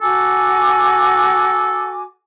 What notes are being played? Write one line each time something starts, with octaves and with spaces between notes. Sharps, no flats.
F#4 A4 G#5 D6